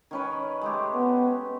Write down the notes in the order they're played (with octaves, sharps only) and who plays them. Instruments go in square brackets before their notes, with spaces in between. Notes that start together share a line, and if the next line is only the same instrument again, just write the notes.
[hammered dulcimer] D#3 C#4 B4
G#3 A3 G4
[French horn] B3